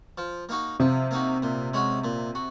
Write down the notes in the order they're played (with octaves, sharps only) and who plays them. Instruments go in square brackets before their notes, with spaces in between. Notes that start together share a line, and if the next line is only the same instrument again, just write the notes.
[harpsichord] F3
A#3 D#4 F#4
[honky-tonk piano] C3 [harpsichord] F3
[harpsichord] A#3 D#4 F#4
A#2
G#3 C#4 F#4
A#2
F#4